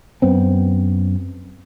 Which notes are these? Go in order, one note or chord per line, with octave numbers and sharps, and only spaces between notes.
F#2 B3 C4